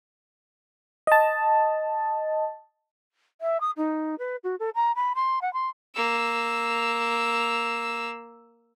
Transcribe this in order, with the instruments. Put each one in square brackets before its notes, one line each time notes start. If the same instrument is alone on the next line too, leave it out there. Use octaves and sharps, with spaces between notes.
[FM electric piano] D#5 A5
[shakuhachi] E5
D#6
D#4
B4
F#4
A4
A#5
B5
C6
F#5
C6
[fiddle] A#3 E6